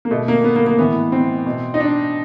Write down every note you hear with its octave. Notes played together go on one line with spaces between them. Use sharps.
A#3
B2 A3
A#3
B3
A#3
A#3
A2 E3 B3
C4
B2
D#4
D4